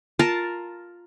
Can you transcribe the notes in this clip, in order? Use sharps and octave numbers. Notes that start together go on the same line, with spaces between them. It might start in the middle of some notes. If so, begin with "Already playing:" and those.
F4 A#4 A5